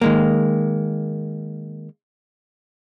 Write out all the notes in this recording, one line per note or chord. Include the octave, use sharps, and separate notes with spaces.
D#3 G#3 A#3